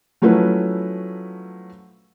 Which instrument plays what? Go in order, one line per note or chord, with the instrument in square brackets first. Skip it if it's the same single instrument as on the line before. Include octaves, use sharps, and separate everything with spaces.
[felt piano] F3 F#3 A3 C#4 E4 B4